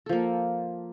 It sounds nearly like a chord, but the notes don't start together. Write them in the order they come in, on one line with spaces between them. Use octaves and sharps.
A4 F3 A#3